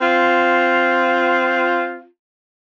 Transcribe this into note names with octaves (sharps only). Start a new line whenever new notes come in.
C4 F4